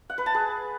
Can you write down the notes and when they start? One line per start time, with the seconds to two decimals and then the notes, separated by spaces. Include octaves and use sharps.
0.10 F#5
0.18 B4
0.26 A5
0.34 G#4